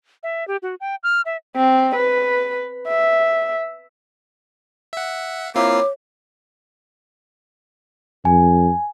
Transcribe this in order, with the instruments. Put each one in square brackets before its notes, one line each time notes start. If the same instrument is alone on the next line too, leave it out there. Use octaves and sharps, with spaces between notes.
[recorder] E5
G4
F#4
G5
F6
E5
[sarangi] C4
B4
E5
[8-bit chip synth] E5 F#5
[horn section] A#3 E4 [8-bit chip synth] C4 F4 C7 [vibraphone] C#5 [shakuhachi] D6
[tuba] F2 [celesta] G#5